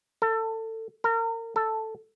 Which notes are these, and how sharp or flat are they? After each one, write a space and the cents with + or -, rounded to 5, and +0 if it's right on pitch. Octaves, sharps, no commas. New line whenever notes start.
A4 +25
A#4 -35
A4 +5